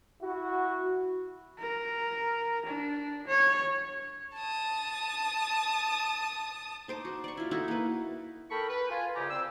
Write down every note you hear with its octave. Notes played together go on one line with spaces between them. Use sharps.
E4 F#4
A#4
D4
C#5
A5 D#6
D#4 C5 D6
F#4
D5 C#6
E4 F4
D#4 E4 F#4 A4
A#3 B4
A4 A#4 G5 B5 C#6
B4
F4 G#5
C2 C#3 F4 G4 A#5 D6
C4 C5 D5 E6